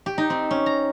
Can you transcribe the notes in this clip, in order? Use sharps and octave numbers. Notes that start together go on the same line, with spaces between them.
G4
D#4
C4
C#4
A#5